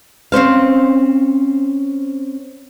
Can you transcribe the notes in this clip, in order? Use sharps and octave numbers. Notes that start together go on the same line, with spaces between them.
C4 C#4 C5 F5